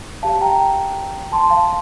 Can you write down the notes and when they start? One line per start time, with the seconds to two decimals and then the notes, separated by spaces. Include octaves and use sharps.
0.23 G4 D5 F5 A5
0.41 G5 A#5
1.32 A5 C6
1.50 F5 A5